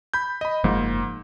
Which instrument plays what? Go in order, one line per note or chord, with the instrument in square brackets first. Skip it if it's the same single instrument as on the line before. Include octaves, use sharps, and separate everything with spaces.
[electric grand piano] B5 G6
D#5 B5
[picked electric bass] F#1 F3 A#3 [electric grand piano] G#2